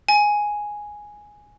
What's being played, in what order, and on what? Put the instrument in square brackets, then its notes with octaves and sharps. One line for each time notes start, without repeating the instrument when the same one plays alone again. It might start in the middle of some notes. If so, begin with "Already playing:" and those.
[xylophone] G#5